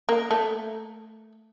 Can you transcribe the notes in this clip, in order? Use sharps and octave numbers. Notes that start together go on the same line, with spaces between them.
A#3
A3